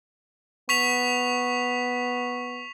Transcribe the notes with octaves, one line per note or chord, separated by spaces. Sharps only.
B3 C#6 B6 F7